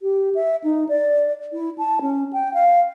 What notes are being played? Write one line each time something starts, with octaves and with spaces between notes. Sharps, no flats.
G4
E5
D#4
D5
E4
A5
C#4
G5
F5